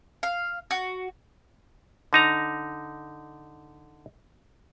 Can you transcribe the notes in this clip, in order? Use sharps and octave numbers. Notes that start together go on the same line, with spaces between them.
F5
F#4
D3 D#4 A#5